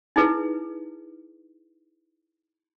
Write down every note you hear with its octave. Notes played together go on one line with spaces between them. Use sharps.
D#4 E4 G#4 B4